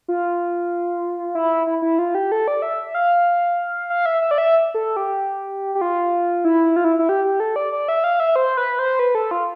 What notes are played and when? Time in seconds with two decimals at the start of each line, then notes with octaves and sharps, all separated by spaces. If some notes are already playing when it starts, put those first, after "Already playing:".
0.08 F4
1.35 E4
1.67 E4
1.82 E4
1.99 F4
2.15 G4
2.32 A4
2.48 D5
2.62 E5
2.95 F5
3.90 F5
4.06 E5
4.22 E5
4.31 D5
4.38 E5
4.74 A4
4.97 G4
5.75 G4
5.81 F4
6.45 E4
6.76 F4
6.84 E4
6.99 E4
7.09 G4
7.24 G4
7.40 A4
7.56 D5
7.73 D5
7.88 E5
8.04 F5
8.20 E5
8.36 C5
8.57 B4
8.79 C5
8.99 B4
9.15 A4
9.31 F4